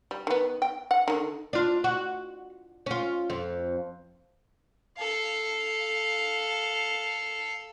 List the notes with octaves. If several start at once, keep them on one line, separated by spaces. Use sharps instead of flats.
G3
D#3 B3
G5
F#5
D3 D#3
D4 F4
F#4
C#4 F4
F2
A4 F5